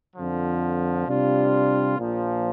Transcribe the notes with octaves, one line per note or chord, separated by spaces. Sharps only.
F2 D3 F3
C3 G3 D4 F4
A#1 A#2 F3